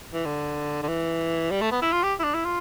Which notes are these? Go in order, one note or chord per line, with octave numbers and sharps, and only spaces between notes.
E3
D3
D3
E3
G3
A3
B3
E4
F4
G4
E4
D4
E4
F4